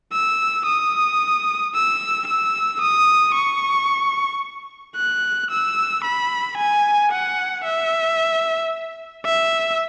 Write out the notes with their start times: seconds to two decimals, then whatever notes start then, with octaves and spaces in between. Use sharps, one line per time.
0.13 E6
0.66 D#6
1.75 E6
2.27 E6
2.82 D#6
3.35 C#6
4.96 F#6
5.51 E6
6.04 B5
6.58 G#5
7.12 F#5
7.65 E5
9.26 E5